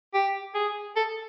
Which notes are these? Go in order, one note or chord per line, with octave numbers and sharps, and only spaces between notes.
G4
G#4
A4